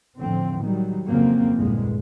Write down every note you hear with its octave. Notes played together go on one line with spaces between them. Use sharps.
A1 F2 A2 D3 F3 C4
D#3 F#3 G3
F2 G#2 C#3 F#3 A#3 C4
A#1 E2 G2 A#2 D3 G#3